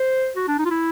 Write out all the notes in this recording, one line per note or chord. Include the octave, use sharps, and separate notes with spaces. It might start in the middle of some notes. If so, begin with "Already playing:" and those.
Already playing: C5
F#4
D4
D#4
F4
E4